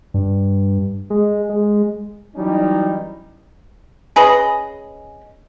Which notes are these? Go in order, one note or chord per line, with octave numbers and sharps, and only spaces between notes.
G2
G#3
G#3
E3 F#3 G3 C#4 D#4
C#4 G#4 B4 D#5